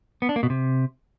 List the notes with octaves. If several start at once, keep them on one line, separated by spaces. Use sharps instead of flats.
B3
D4
A#3
B2
C3